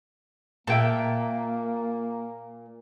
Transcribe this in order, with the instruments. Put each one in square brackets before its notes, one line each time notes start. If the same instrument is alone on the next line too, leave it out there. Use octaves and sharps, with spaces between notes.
[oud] A#2 [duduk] A#3 [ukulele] E5 G5 A5